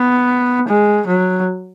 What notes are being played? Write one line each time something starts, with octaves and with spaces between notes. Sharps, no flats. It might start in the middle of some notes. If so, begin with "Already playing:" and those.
Already playing: B3
G#3
F#3